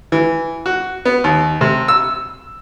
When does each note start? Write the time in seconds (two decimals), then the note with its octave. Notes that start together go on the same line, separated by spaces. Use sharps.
0.12 E3
0.66 F#4
1.05 B3
1.24 D#2
1.61 C3
1.88 E6